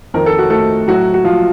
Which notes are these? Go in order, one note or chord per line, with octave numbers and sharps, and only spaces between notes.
F2 D#3 A#4
A4
F#4
A3 A4
A2 F#3 F#4
F#4
F3 F4